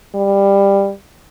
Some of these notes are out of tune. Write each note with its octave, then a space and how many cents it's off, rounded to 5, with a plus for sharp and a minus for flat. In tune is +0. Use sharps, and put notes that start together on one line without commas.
G3 +15